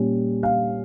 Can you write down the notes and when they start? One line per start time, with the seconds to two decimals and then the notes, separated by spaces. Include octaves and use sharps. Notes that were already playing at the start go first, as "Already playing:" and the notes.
Already playing: A#2 G3 C#4
0.43 F5